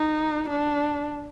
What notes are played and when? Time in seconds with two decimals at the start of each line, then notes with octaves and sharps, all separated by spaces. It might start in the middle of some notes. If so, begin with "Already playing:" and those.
Already playing: D#4
0.50 D4